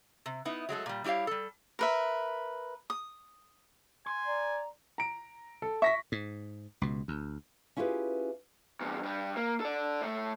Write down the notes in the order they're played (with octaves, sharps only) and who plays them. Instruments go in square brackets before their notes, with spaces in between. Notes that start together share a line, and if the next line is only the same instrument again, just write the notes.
[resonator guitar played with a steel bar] C3
B3 D#4 E4
F#3 G#3 A3 A4
A#2 G3
G3 E4 G4 C#5 F5
G3 A4
[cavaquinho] A#4 B4 E5
D#6
[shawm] G#5 [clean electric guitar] C6
[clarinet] D5 [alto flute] A#5
[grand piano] A#5 D7
A4
[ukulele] E5 [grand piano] C#6 A#6 B6
[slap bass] G#2
C#2 B2
D2
[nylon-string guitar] C#4 E4 F4 G4 G#4 B4
[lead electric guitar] E2 G2
G2 G3
A#3
A4 D5
A2 A3